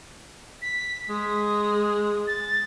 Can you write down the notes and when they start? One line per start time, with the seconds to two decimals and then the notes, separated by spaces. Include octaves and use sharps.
0.62 B6
1.09 G#3 D#6
2.27 A6